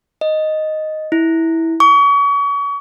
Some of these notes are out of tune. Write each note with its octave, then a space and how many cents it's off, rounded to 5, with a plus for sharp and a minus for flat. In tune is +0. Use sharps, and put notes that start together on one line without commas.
D#5 +0
E4 -15
C#6 +35